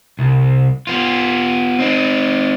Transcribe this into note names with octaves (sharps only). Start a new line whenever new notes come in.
C2
B3 F4
C4 D#4